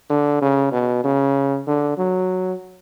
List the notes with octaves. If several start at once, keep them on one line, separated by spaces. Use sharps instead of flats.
D3
C#3
B2
C#3
D3
F#3